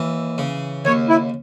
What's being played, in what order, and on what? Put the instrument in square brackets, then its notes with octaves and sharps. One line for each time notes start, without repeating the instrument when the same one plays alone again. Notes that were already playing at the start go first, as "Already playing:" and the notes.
Already playing: [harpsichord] D#2 E3
C#3
[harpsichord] D#2 [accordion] C#5
[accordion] E4